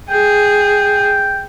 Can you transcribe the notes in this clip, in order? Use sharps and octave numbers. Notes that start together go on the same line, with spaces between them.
G#4 G5